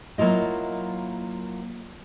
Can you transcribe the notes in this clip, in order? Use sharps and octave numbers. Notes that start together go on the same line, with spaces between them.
F#3 A#3 E4 F4 D#5